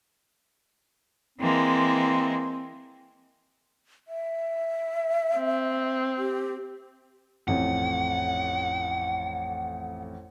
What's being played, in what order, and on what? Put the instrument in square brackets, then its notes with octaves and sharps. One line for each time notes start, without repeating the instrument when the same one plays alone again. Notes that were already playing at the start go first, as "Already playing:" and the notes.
[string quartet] E3 G#3 A#3 [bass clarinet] C4
[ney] E5
[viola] C4
[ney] G4
[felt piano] A1 F2 [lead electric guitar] F#5